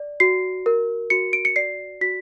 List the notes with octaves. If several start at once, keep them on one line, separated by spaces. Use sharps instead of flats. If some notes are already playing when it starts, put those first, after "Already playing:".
Already playing: D5
F#4 C7
A#4
F#4 C#7
D7
C#7
D5 C7
F#4 B6